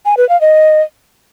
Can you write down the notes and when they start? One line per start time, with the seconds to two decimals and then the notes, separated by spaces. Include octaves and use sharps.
0.05 G#5
0.17 B4
0.29 F5
0.41 D#5